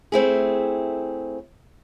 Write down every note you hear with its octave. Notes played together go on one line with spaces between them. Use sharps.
A3 C4 E4 G#4